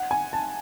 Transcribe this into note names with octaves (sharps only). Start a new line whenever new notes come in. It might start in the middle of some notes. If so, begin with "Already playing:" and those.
Already playing: F#5
G#5
A5